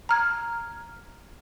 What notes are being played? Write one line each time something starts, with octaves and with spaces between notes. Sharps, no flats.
A#5 F6 G#6